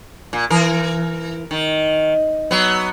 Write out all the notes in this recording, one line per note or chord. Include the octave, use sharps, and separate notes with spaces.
A#2
E3 A#4
D#3
F#3 B3